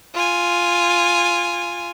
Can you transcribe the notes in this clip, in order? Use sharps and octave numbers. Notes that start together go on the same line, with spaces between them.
F4 G#5